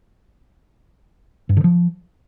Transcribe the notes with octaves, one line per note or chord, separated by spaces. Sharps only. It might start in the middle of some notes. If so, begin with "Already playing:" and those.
G2
D3
F3